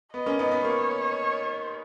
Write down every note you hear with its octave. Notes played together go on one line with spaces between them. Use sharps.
B3 D#5
A#3 C#4
B3 D#4
B3
A#3 C#5